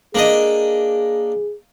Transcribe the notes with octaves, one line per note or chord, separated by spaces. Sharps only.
A#3 D4 G#4 D#5